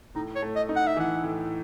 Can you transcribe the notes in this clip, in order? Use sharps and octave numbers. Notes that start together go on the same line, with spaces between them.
A2 D#4
C#5
A3
D#5
D#4
F#5
E5
E3 F#5
A2